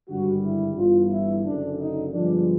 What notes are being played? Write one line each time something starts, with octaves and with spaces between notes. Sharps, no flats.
G#1 G2 D3 G3 F#4
E4
G1 G2 E3 F4
E4
F#1 F#2 D3 D4
D#4
G2 D3 F3 G#3 B3 D4